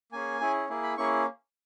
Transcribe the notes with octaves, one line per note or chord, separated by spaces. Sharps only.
A#3 C#4 G#4 G#5
C#4 E4 G#4
A#3 E4 G#4
B5
A#3 C#4 E4 G#4 C#6